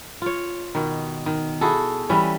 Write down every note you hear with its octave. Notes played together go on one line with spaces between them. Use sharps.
F4 C#5
B2 D#3
D#3
E4 F#4 G#4 A4
E3 G3 C#4 E4